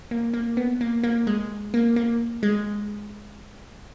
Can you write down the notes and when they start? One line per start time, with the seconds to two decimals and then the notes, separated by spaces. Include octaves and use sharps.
0.11 A#3
0.34 A#3
0.57 B3
0.81 A#3
1.04 A#3
1.27 G#3
1.74 A#3
1.96 A#3
2.43 G#3